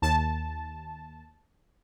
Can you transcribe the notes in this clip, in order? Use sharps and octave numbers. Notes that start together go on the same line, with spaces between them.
D#2 A5